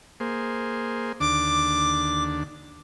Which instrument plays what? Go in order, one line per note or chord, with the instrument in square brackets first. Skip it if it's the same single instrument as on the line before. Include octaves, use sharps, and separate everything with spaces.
[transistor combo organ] A#3 G#4 C5
[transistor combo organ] D#2 D3 D4 [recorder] D6